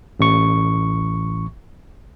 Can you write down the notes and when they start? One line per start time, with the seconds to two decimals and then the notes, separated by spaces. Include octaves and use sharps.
0.20 A1 C#6